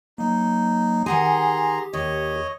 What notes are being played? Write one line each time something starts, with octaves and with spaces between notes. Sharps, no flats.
F#3 A#3 D#4
D#3 G4 G#4 F#5 G#5 A#5 C6
D#2 C#5 D#5